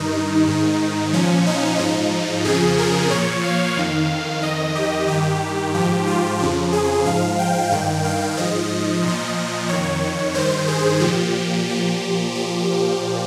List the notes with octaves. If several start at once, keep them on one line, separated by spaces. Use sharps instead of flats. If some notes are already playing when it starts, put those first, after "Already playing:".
Already playing: G2 D#3 D#4
G#2 D#3
A#2 F3 C#4
D#4
G#2 F3 D#4
F2 C#3 F3 G#4
A#4
A#2 F3 C#5
F5
F2 D#3
F2 D#3 D#5
G4
G2 D#3 G4
G#2 F3 G4
F4
F2 C#3 F3
G#4
G#2 F3 F5
G5
G2 D#3 G5
F5
G#2 F3 D#5
A#2 F3
F2 D#3 C#5
G2 D#3 C5
G#4
A#2 F3 G4
A#2 F3
A#2 F3